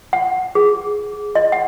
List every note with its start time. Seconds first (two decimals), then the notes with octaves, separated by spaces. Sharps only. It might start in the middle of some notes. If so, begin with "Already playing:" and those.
0.13 F#5
0.55 G#4
1.35 D#5
1.52 F#5